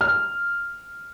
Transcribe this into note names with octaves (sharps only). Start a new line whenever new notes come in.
F6